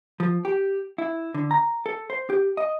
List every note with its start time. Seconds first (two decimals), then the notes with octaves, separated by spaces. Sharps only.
0.20 F3
0.45 G4
0.98 E4
1.34 D3
1.51 A#5
1.86 A4
2.10 C5
2.30 G4
2.57 D#5